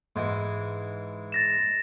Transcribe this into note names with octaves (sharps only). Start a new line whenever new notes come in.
G#2 E3
A6 A#6 E7